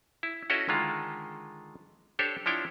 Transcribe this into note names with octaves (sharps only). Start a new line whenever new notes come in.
E4
C#4 E4 F#4 A4 C#5 D#5
D3 D#3 G#3 F4
D4 G4 A4 C5 C#5
F3 D4 E4 C#5 G5